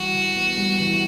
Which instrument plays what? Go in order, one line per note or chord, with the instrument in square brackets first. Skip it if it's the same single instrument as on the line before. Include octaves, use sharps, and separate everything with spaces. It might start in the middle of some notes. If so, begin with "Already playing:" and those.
Already playing: [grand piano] E3 G3 [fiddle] F#4
[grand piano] E3
B3
G3
E3